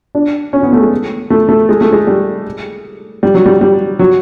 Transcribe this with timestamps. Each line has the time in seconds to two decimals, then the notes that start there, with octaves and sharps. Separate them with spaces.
0.15 D4
0.53 C#4
0.63 B3
0.73 A3
0.81 G#3
1.30 A3
1.49 A3
1.69 G#3
1.81 A3
1.93 G#3
2.07 G3
3.23 G3
3.34 F#3
3.46 G3
3.61 G3
3.99 F#3